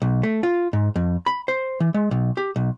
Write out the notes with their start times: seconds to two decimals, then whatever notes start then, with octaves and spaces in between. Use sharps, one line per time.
0.02 B1
0.23 A3
0.43 F4
0.73 G#2
0.96 F2
1.26 B5
1.48 C5
1.80 E3
1.94 G#3
2.11 B1
2.37 G4
2.56 B1